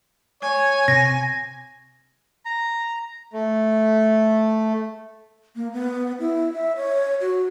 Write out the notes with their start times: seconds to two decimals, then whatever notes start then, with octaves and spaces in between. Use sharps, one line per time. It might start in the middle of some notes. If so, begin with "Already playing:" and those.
0.42 C#5 G#5
0.88 C3 A#6
2.45 A#5
3.33 A3
5.56 A#3
5.73 B3
6.19 E4
6.53 E5
6.76 C#5
7.21 F#4